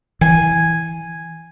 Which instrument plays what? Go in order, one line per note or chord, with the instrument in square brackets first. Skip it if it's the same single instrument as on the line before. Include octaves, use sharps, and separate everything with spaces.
[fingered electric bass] E3 [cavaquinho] G#5